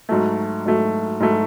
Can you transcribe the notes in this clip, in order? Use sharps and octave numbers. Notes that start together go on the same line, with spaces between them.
G#2 F#3 A3
G#2 F#3 A3
G#2 F#3 A3